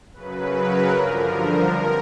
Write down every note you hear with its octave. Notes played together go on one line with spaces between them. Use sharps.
F#2 C#3 F#3 B4
A#4
G2 D3 F3 A#4
A#4
F2